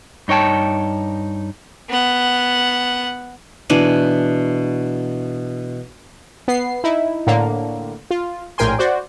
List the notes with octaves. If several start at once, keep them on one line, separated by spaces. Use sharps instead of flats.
G2 D#4 C#5 G5 A5
B3 F#5
B2 E3 D4 G#5
B3 C7
D#4 E4
A2 D3 A#3
F4
A#1 A2 A#4 G5 G#5 C6
F#4 C5 D5